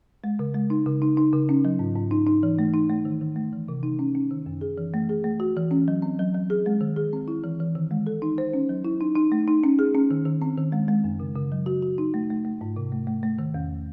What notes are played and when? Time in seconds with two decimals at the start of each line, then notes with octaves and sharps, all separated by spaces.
0.24 G#3
0.39 C#3
0.54 G#3
0.70 D#4
0.86 C#3
1.02 D#4
1.17 D#4
1.33 C#3
1.49 C#4
1.65 F#3
1.79 G#2
1.96 G#2
2.11 D#4
2.27 D#4
2.43 E3
2.59 A3
2.74 D#4
2.90 A3
3.05 D#3
3.21 D#3
3.36 A3
3.53 E3
3.68 C3
3.83 D#4
3.99 C#4
4.15 C#4
4.31 D#3
4.46 F#2
4.61 G#4
4.78 E3
4.94 A3
5.09 G#4
5.24 A3
5.40 F#4
5.56 E3
5.71 C#4
5.88 F#3
6.02 C4
6.19 F#3
6.34 F#3
6.50 G#4
6.66 G#3
6.81 D#3
6.96 G#4
7.13 C4
7.28 E4
7.44 E3
7.60 E3
7.75 D#3
7.91 G#3
8.07 A4
8.22 D#4
8.38 C5
8.53 C#4
8.69 F#3
8.85 E4
9.01 D#4
9.16 D#4
9.32 A3
9.48 D#4
9.64 C#4
9.79 G#4
9.95 C#4
10.11 D#3
10.26 D#3
10.42 C4
10.58 D#3
10.72 G#3
10.88 G#3
11.04 F#2
11.20 C#3
11.35 C#3
11.52 F#3
11.66 F#4
11.82 F#4
11.98 D#4
12.14 A3
12.30 A3
12.45 A3
12.61 G#2
12.76 C3
12.92 A3
13.07 A3
13.23 A3
13.39 D#3
13.54 E2